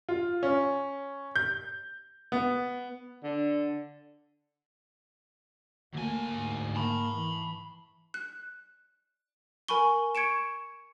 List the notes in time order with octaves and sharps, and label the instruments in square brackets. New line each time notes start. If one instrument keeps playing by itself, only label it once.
[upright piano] F4
C#4
G6
B3
[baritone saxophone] D3
[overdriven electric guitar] D2 G#5 [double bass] A3 A#3
[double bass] G#2
[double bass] A#3 [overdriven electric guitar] A5 B5
[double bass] E3
[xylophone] F#6
A#4 G#5 B5 C#6 G7
C#6 G#6 C#7 D7 E7